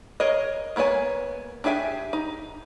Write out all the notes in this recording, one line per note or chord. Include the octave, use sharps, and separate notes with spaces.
G#4 A#4 C#5 D#5
G#3 A#3 B3 C#5 G#5
D4 G4 G#4 E5 G#5
D#4